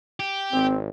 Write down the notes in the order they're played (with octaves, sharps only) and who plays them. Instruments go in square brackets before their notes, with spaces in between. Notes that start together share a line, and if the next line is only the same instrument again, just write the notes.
[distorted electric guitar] G4
[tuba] G#1 [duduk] C4